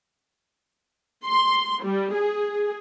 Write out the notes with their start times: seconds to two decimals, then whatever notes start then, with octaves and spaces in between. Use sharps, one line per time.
1.25 C6
1.83 G3
2.14 G#4